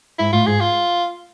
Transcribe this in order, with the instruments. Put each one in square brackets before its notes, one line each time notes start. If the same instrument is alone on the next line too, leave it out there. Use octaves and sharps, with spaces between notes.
[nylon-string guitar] G#2 [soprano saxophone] E4
[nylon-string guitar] A2 [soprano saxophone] F4
[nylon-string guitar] G#2 [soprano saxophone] G#4
[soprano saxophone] F4